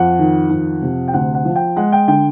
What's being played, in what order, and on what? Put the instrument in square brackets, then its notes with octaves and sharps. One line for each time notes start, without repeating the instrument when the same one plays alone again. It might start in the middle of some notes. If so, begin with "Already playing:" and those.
Already playing: [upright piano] F2 F#5
D#3
F2
C3
G5
D2 F#5
F#5
F3
G5
G#3 F#5
G5
D3 G5